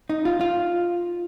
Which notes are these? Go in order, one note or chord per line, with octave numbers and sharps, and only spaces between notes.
D#4
F4
F4